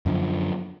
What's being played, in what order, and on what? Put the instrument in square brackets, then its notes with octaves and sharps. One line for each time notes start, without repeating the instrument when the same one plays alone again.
[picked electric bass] F#2 D3 F3